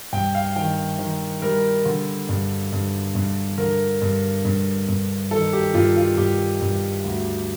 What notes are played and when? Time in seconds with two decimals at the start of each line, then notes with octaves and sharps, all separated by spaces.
0.13 G2 G5
0.35 F5
0.56 D#3 G5
0.99 D#3
1.42 G3 A#4
1.85 D3
2.29 G2
2.72 G2
3.15 G2
3.58 D3 A#4
4.01 G2
4.45 G2
4.88 G2
5.31 D#3 A4
5.53 G4
5.74 G2 F4
5.96 F4
6.17 G2 G4
6.61 G2
7.04 D2